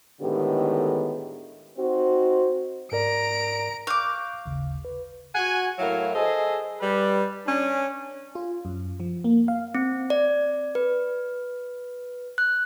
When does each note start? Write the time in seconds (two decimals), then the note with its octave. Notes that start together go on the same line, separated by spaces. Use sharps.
0.21 A2 D3 D#3 G#3 B3 G4
1.78 C4 D#4 F#4 C5
2.92 G#2 A#4 D5 A#5 D7
3.87 F5 C#6 D6 F#6 G6
4.46 G#1 D#2 C#3
4.85 B4
5.35 F#4 F#5 G#5
5.79 A2 F#3 E4 A#4 F5
6.14 G#4 A4 C5 D#5
6.80 G3 B4
7.46 C#4 D4
8.35 F4
8.65 F#2
9.00 F3
9.24 A#3
9.48 F5
9.75 C4
10.10 D5
10.75 B4
12.38 F#6